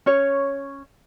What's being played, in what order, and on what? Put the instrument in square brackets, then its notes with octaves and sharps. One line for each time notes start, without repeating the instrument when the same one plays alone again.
[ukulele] C#4 C#5